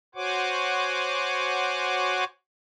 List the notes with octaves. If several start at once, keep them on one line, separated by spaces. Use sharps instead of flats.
F#4 C5 C#5 F#5 G#5 D6